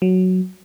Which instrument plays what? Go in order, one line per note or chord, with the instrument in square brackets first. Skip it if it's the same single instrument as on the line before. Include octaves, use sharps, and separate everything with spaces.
[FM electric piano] F#3